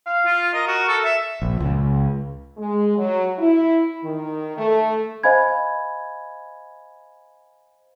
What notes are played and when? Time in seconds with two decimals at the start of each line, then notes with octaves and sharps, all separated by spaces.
0.06 F5
0.26 F4
0.54 A#4 D#5
0.67 F#4
0.88 A4
1.04 E5
1.42 A#1
1.60 C#2
2.57 G#3
2.97 F#3
3.39 E4
4.03 D#3
4.57 A3
5.23 C5 D#5 F5 G#5 B5 G#6